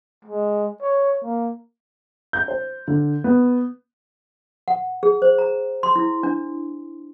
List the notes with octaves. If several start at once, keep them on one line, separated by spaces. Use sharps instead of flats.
G#3
C#5
A#3
G6
C5
D3
B3
F#5
G#4
C5
A#5
C6
E4
D4